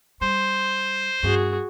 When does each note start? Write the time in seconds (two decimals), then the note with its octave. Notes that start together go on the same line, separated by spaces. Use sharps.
0.21 G3 C5
1.23 G2 C#4 F#4 G#4